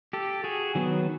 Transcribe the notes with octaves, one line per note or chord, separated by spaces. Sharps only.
G4 A4
F#4 G#4
D#3 F#3 B3